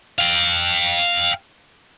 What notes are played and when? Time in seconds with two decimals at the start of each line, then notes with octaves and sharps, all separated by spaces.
0.19 F5 G5